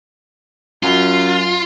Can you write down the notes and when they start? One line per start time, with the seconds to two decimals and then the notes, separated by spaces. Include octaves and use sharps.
0.83 F#2 F4